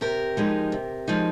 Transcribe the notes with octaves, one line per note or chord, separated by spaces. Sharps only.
C3 G4 A#4
F3 G#3 D#4
C3
F3 G#3 D#4